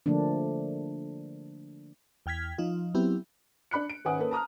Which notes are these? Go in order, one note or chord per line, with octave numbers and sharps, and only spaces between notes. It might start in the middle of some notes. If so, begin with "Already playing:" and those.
D3 F3 A3 A#3 D4
E2 G5 F6 G#6 B6
F3 D#4 F4
F#3 B3 C4 E4 G4
D4 B5 F#6 C#7
D7
G#1 C#4 B4 F#5 G#5 D#6
A#3 C#4 A4 B4
A5 A#5 D#6 F6